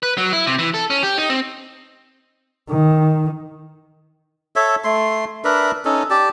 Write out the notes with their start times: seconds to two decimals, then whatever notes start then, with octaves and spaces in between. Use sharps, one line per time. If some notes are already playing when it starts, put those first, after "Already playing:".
0.03 B4
0.18 F#3
0.33 E4
0.47 C3
0.59 E3
0.74 A4
0.90 C#4
1.03 G4
1.18 D#4
1.30 C4
2.70 D#3
4.56 A4 C#5 E5
4.84 A3 C6
5.44 D4 A#4 B4 E5
5.85 C#4 D#4 A4
6.10 G4 D5 A5